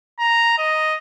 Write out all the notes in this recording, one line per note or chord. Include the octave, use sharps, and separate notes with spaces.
A#5
D#5